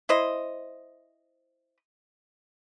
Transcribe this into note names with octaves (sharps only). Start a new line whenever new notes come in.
E4 C5 D#5